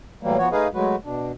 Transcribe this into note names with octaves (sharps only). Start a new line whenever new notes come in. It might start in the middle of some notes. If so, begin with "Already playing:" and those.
A2 E3 F#3 G3 A#3
F3 B3 F#4 C#5
A3 D#4 G#4 B4 D#5 F5
F#3 G#3 A3 F#4 B4
B2 D4